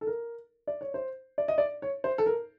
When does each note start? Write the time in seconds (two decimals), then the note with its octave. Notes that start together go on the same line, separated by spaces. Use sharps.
0.01 A4
0.07 A#4
0.67 D5
0.81 C#5
0.94 C5
1.38 D5
1.48 D#5
1.58 D5
1.82 C#5
2.04 C5
2.18 A4
2.26 A#4